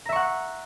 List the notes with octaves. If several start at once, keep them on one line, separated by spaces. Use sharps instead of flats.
E5 F#5 A#5 C#6